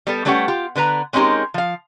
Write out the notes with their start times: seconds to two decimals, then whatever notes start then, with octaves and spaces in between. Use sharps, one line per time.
0.07 G3 B3 A4
0.25 G3 A3 C#4 G4 B4 F#5
0.48 F4 G4
0.76 D3 B3 B4 A#5
1.13 G#3 C4 C#4 D#4 G4 A#4
1.54 F3 F5